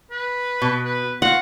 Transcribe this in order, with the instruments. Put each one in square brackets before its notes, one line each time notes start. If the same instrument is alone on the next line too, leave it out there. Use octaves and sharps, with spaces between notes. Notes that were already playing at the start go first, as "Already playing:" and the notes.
[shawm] B4
[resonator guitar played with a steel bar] B2
[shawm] B4
[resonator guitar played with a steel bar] F4 [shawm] F#4 [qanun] F#5